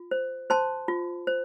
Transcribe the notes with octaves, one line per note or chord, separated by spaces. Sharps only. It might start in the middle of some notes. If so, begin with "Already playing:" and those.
Already playing: F4
C5
C5 A5 C6
F4
C5